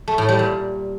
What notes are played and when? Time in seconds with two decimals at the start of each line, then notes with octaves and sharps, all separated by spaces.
0.08 A3
0.18 A2
0.29 G3
0.39 A#2